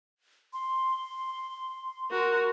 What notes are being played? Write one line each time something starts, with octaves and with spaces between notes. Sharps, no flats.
C6
F#4 A#4